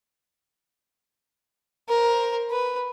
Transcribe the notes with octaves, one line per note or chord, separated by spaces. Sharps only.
A#4 C5
B4